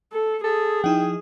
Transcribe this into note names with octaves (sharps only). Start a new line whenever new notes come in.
A4
G#4 A4
F3 D#4 E4 G5